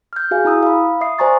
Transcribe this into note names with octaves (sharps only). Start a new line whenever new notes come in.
F6 G6
F#4 G#4 F5 G#5
E4 A#5 D#6 E6
F5 B5
E5 D#6 C7
C5 D5 G#5 A#5 C#6 A6